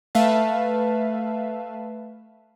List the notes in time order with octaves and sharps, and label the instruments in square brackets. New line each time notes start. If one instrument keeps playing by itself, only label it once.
[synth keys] A3 B4 E5 F5 A5